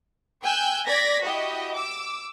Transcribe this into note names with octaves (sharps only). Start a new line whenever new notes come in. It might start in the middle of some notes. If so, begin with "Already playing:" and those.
G5 G#5 E6 F#6 G6
D5 G#6 A#6 B6
E4 F#4 G4 D#5 G5
D6 E6